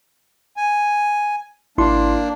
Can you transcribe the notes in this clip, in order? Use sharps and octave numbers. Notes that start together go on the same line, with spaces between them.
G#5
G#1 A#3 D4 E4 C6